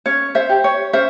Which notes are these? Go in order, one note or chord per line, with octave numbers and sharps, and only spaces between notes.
C#4 C#5
C5 E5
G4
C#5
C#4 C5 E5